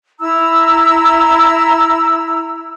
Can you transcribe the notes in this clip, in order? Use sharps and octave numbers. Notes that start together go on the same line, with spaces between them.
E4 A#5 E6